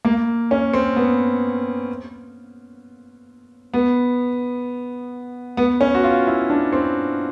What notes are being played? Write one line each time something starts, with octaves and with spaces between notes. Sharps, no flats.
A#3
C#4
C4
B3
B3
B3
C#4
F#4
F4
E4
D4
C4